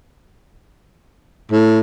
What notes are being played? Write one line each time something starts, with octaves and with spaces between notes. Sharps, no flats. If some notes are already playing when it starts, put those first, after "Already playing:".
A2